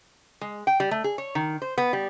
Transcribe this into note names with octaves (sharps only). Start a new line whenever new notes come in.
G#3
G5
G3
A3
G#4
C#5
D#3
C5
B3
G3